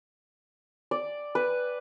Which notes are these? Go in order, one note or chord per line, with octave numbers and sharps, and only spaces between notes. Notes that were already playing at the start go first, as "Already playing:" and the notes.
D5
B4